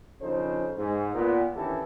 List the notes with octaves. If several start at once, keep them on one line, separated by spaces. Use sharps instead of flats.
A#1 C#3 F3 D#4 A4 C5
G#2
A#2 B3
D#3 E3 C#4 D4 G4 A4